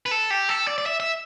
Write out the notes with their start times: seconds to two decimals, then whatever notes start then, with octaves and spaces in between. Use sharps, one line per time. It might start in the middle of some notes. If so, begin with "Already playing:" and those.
0.06 B4
0.11 A4
0.30 G4
0.49 A4
0.67 D5
0.78 D5
0.86 E5
1.00 E5